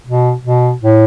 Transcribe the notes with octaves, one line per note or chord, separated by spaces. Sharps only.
B2
B2
A2